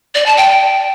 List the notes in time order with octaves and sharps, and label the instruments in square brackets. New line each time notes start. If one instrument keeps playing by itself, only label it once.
[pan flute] D5
A5
G5